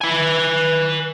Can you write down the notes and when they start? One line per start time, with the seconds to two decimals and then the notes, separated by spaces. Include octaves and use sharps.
0.01 B4 G#5